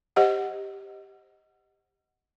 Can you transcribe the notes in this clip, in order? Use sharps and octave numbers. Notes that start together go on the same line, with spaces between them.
G4 C5 D#5 F#5